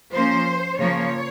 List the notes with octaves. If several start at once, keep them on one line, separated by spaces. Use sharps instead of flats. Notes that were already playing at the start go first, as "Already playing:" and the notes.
F3 A#3 C#4 C5
C#3 F3 A#3 C#5